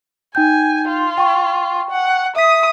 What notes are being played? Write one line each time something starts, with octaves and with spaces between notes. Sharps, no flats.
D#4 G5 G#5 G6
F4
G5 C#6
F#5
E5 D#6 B6